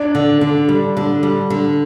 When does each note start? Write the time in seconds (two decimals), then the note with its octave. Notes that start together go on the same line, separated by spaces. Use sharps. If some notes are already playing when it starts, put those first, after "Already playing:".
Already playing: D4
0.15 D3
0.41 D3
0.69 G3
0.97 D3
1.23 G3
1.50 D3